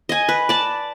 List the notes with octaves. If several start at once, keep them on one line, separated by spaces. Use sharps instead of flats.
D#5 G#5
B4
D5 A5